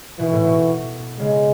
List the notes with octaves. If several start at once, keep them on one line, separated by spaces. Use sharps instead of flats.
B2 E3
A2
B2
C#3 G#3